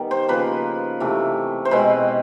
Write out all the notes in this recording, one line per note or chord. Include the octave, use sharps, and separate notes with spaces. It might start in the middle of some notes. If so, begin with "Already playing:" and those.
Already playing: D#3 G3 B3
C5
C#3 F3 A#3 B4
C3 E3 A3
C5
B2 G#3 C4 B4